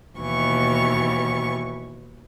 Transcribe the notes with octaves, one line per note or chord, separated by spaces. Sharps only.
D#2 B2 E3 C#6